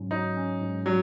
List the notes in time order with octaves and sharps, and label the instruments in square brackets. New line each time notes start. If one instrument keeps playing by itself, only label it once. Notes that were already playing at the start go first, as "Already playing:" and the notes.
Already playing: [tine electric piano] G#2 F#3 C#4
[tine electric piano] F#3 [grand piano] D#4
[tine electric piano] C#4
G#2
[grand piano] F#3 [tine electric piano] D#4